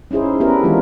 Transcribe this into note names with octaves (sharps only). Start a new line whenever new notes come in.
C#4 D#4 E4 G#4 C5
B3 D4 E4 G4 A#4 B4
D#3 E3 G#3 C4 D4 F4